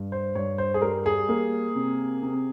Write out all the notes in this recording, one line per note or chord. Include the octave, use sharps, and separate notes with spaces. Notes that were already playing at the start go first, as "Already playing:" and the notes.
Already playing: G2
C5
G2 C#5
C5
G#4
G3 A#4
G#4
A#3
C3
C3